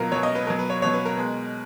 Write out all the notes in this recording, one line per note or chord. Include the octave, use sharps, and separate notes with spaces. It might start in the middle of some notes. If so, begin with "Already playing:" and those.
Already playing: B2 F#3 F4 A#4
B2 F#3 C#5
D#5
B4
B2 F#3 A#4
B4
C#5
B2 F#3 C#5
B4
A#4
B2 G#3